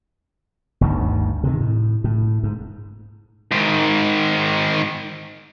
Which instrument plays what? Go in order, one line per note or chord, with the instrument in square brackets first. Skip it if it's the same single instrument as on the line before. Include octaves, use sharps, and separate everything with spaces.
[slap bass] G1 D2 G2 D#3
C3 D#3
A2
A2
G#2
[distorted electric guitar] G#2 D#3